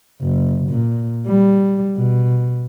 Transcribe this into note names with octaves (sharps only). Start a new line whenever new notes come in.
F#1
A#2
G3
B2